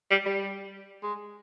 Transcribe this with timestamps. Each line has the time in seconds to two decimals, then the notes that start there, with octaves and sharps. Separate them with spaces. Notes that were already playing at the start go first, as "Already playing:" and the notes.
0.11 G3
0.26 G3
1.03 G#3